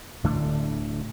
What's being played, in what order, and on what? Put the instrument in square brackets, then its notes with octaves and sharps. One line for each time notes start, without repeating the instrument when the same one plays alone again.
[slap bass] D1 D3 A3 D4